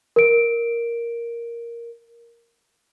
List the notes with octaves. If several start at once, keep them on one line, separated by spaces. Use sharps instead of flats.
A#4 D7